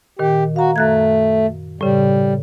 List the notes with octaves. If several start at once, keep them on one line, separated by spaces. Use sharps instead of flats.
A#2 D#3 G4
F#4 F5 A#5
F#2 A3 F#6 G#6
A2 C#3 G3